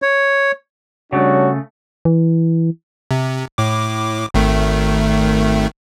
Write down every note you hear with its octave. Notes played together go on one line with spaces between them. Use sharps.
C#5
C#3 G3 A3 D4 F#4 C#5
E3
C3
A2 D6
G#1 D#3 A3